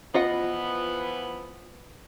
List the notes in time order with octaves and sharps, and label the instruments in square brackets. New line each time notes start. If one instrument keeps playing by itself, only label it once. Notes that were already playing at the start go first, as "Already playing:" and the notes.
[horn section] E3 F3 B3 [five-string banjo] F4 D#5 F#5